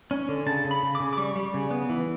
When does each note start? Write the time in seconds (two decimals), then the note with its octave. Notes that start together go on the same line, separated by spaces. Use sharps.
0.11 C#4
0.29 D3
0.46 C#3 A5
0.65 C#3
0.71 B5
0.83 C#3
0.95 D6
1.00 C#3
1.13 D6
1.17 G3 C#6
1.36 G3
1.54 C#3
1.71 B3
1.89 E3